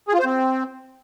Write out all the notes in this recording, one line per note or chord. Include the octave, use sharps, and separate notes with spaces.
G#4
F4
C5
C4